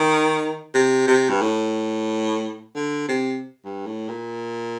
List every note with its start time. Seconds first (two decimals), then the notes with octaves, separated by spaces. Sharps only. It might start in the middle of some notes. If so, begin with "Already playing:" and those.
Already playing: D#3
0.74 C3
1.07 C3
1.30 G2
1.41 A2
2.75 D3
3.08 C3
3.65 G2
3.86 A2
4.08 A#2